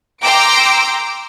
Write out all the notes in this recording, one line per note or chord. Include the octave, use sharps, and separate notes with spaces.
G5 A#5 C6 D6 E6 D7